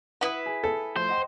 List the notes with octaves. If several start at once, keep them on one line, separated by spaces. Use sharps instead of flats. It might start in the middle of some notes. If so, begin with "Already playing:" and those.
E4 B4 F#5 D#6
G#4
A4
F3 A3 C5
D#5 F#5 G5